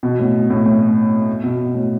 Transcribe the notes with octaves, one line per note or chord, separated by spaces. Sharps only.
B2
A2
A2
A2
B2
A2